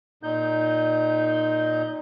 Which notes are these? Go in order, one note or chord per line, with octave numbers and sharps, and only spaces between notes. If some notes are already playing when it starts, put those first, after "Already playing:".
A#2 D#4 G6